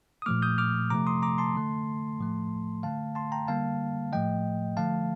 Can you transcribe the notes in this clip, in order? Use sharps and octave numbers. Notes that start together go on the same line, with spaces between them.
D#6
A#2 F3 A3 D6 F6
D#6 G6
D6 F6
C3 F3 A3 A#5 D6
C6 D#6
A#5 D6
A5 C6
D3 A3
A2 F3 A3
D3 A3 F5 A5
A5 C6
G5 A#5
D3 G3 A#3 F5 A5
A2 F3 A3 D#5 G5
D3 F3 A3 F5 A5